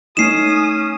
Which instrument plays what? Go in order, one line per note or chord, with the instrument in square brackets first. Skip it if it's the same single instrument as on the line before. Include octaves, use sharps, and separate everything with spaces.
[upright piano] A3 D#4 [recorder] C#4 [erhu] D#6 [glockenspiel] C7 E7